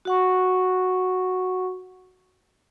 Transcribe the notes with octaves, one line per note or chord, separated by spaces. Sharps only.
F#4 F#5 C#6